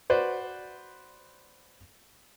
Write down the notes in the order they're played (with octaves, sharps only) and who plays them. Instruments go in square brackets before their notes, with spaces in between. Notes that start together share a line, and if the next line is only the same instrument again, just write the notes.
[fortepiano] F#4 B4 C5 D5